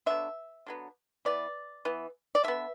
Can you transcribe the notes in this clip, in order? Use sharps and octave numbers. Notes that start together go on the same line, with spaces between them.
D3 F#3 B3 E5
D3 F#3 B3
E3 B3 D5
E3 B3
D5
D3 B3 E5